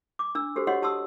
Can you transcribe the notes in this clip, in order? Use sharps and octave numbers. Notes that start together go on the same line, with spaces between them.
D6
D4 E6
F#4 G4 A4 C5
F#4 G4 C#5 D#5 F#5 C6
G4 A5 C6 D#6 E6